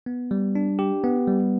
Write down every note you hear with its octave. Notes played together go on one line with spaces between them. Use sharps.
B3
G3
D4
G4
B3
G3